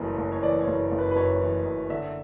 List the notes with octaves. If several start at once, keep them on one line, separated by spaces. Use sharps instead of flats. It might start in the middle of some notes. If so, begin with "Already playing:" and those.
Already playing: F#1 F#2 E3 A3
F#1
C#5
E3 D5
C#5
F#1
F#1
B4
B4
F#2 C#5
E3
F#2
D3 E5